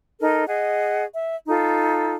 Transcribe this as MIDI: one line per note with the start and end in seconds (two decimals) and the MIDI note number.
0.20 0.44 63
0.20 0.44 69
0.20 0.44 70
0.47 1.05 68
0.47 1.05 75
0.47 1.05 78
1.15 1.35 76
1.47 2.16 63
1.47 2.16 65
1.47 2.16 69